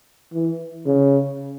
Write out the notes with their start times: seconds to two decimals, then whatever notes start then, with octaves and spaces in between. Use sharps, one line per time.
0.33 E3
0.86 C#3